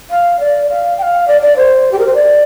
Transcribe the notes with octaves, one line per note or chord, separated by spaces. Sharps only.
F5
D5
F5
G5
F5
D5
D5
C5
G4
A#4
C5
D5